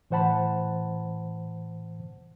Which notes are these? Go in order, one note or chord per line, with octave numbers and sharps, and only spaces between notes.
A2 E3 C5 F#5 A5 B5